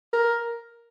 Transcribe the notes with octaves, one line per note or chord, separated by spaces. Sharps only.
A#4